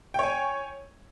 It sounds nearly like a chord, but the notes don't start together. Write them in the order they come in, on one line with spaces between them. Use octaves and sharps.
G5 C#5 G#5